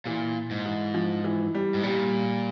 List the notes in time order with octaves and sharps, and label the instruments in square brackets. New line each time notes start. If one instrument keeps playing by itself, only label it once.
[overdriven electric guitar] A#2 [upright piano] E3
[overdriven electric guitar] G#2
[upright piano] E3
F3
E3
G3
[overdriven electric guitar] G#2
[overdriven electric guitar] A#2 [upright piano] G3